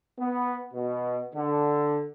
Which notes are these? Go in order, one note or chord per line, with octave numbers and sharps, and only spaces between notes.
B3
B2
D3